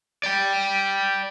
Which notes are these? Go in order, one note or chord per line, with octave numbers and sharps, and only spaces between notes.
D5 G5